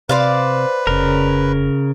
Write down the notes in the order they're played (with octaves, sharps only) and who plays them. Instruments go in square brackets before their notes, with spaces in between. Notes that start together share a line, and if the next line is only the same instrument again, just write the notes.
[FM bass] C3 [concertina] B4 [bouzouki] C5 D5 F5
[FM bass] F1 [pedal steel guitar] C#3 A#4